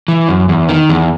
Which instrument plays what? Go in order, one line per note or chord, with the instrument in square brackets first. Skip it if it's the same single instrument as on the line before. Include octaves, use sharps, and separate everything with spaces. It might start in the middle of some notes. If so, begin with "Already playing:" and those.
[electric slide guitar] E3
F#2
E2
D#3
E2